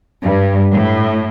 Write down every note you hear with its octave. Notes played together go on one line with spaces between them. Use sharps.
G2
A2